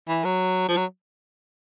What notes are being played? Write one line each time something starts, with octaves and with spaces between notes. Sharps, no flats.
E3
F#3
F3
F#3